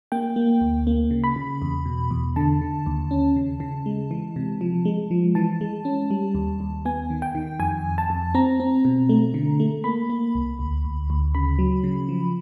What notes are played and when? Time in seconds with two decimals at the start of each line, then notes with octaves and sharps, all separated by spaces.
0.12 A#3 G5
0.36 A#3
0.61 D2
0.87 A#3
1.11 C#3
1.24 B5
1.36 C#3
1.62 E2
1.85 B2
2.11 E2
2.36 D3 A5
2.61 D3
2.86 D#2
3.11 C#4
3.36 C#3
3.60 C#3
3.86 G#3
4.11 E3
4.36 C3
4.61 F3
4.85 G#3
5.11 F3
5.35 E3 A5
5.61 G#3
5.85 C#4
6.10 G3
6.35 D#2
6.60 D#2
6.85 B3 G#5
7.10 D#3
7.22 G5
7.35 D#3
7.59 F2 G#5
7.84 F2
7.98 A5
8.10 F2
8.35 C4 A#5
8.60 C4
8.85 B2
9.09 A3
9.34 D3
9.60 A3
9.84 A#3 B5
10.10 A#3
10.35 C2
10.59 D2
10.84 D2
11.10 D2
11.35 C#3 B5
11.59 F#3
11.84 C#3
12.09 F3